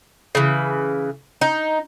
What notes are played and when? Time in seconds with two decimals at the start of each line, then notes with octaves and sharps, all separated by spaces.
0.35 C#3 E3
1.41 D#4